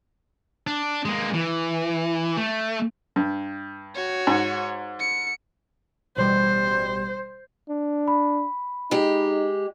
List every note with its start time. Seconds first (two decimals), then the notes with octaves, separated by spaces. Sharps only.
0.67 D4
1.05 G#3 A#3
1.34 E3
2.37 A3
3.16 G2
3.95 F#4 C#5
4.27 G#2
5.00 C#7
6.16 A1 B2 G3 C5
7.69 D4
8.08 B5
8.91 G#3 D#4 G4